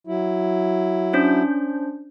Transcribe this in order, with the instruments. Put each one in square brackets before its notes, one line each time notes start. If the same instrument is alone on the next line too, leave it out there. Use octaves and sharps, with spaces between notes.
[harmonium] F#3 E4
[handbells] C#4 D4 C5